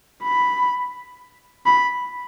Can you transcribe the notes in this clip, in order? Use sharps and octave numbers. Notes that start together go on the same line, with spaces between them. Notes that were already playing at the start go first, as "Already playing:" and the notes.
B5
B5